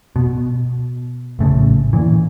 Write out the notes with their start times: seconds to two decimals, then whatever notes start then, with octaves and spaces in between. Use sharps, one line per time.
0.16 B2
1.39 A#1 A2 C#3
1.93 A#2 E3